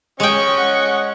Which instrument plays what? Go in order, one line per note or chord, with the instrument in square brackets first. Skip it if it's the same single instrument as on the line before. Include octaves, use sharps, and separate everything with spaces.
[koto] G#3 G5 [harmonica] C#4 D#5 [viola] C#6
[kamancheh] F#5